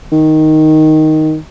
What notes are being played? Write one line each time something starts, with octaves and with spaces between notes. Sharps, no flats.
D#3